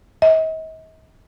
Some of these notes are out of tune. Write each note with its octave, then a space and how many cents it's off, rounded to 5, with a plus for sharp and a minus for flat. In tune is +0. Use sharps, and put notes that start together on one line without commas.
D#5 +45